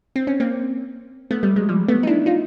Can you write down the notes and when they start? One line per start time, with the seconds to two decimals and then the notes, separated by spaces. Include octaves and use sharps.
0.16 C4
0.27 C#4
0.40 A#3 C4
1.31 A3 B3
1.43 G3 A3
1.56 F#3 G#3
1.69 F3 G3
1.88 A3 B3
2.03 D#4
2.07 D4 E4
2.26 D#4 F4